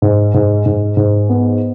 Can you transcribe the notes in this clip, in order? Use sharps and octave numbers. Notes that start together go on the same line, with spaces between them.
G#2
G#2
G#2
G#2
B3